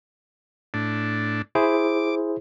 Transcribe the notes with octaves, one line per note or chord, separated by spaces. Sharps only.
A2 D4
E4 G#4 C5 D6